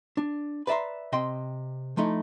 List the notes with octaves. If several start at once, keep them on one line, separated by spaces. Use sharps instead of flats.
D4
B4 D5 E5 A#5 C6
C3 D#5 G5 C6
F3 A3 D#4 E4